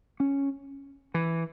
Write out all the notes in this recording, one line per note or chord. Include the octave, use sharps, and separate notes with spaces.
C#4
E3